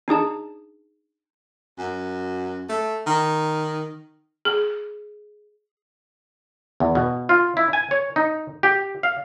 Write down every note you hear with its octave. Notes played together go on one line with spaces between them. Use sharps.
D4 D#4 G#4 A5
F#2
A3
D#3
G#4
E2
B2
F4
E4
G#5
C#5
D#4
G4
F5